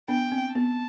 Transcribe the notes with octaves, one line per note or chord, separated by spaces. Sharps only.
B3 D4 G5
C4
B3 A5